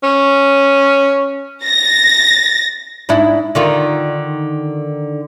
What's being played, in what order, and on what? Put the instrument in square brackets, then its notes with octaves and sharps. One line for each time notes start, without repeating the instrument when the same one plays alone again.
[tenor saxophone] C#4
[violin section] A6 A#6
[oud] G#2 D4 E4
D3 D#3 F4